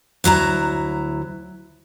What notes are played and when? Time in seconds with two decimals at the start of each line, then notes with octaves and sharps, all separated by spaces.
0.24 D2 F#3 E4 A#5